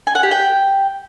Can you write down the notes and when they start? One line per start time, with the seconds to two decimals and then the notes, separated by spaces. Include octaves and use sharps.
0.07 G#5
0.15 F#5
0.23 G4
0.31 G5